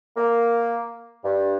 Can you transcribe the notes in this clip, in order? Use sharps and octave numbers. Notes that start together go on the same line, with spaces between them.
A#3
G2